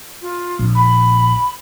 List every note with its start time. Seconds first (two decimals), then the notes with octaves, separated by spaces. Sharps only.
0.21 F4
0.59 A#1
0.75 B5